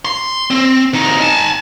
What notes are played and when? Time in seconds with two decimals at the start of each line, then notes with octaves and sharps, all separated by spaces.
0.05 C6
0.51 C4
0.94 D2 D#4
1.21 G#5 A5